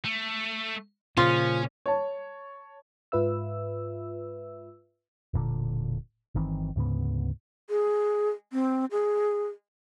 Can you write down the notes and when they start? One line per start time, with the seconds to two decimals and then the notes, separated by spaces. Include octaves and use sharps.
0.05 A3
1.17 A#2 C#3 F3 C#4 F4
1.86 C#5 A5
3.12 G#2 F4 B4 E5 E6
5.34 E1 A#2 D3
6.35 G1 D#3 E3 C4
6.76 D2 G#2 C#3 B3
7.70 G#4
8.53 C4
8.91 G#4